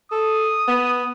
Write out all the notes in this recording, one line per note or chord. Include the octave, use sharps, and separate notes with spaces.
A4 D#6
B3